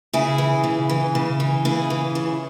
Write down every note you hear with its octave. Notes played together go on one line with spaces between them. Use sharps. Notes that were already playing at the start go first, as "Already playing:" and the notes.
C#3 E4 G#4
E3
C#3
E3
C#3
E3
C#3 E4 G#4
E3
C#3